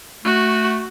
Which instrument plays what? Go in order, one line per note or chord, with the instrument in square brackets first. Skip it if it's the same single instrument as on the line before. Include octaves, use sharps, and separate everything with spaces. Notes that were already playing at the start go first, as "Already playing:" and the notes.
[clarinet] A3 [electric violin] F#4